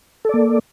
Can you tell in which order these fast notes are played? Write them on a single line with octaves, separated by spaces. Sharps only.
A4 D5 A#3